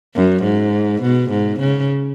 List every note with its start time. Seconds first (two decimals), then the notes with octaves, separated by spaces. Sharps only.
0.15 F#2
0.43 G#2
1.02 B2
1.30 G#2
1.60 C#3